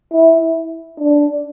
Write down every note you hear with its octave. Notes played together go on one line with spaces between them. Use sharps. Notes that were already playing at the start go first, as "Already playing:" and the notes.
E4
D4